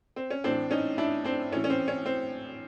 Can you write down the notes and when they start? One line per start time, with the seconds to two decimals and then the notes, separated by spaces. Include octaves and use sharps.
0.16 C4
0.30 C#4
0.44 A2 E3 C4 D4
0.71 C#4 D#4
0.98 D4 E4
1.24 C4 D4
1.51 A2 C#4
1.56 E3
1.64 C#4
1.70 C4
1.88 C#4
2.06 C4